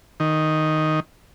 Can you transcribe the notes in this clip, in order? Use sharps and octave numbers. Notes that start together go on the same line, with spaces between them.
D#3